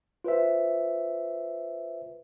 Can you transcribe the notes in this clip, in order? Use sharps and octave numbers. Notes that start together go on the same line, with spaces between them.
F4 B4 C5 E5